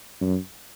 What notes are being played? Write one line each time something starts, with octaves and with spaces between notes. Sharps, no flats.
F#2